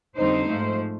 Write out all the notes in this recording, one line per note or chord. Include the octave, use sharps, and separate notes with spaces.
F2 D3 G3 C4 D#4 C5
G#2 F3 A3